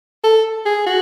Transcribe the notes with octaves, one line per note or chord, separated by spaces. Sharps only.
A4
G#4
F#4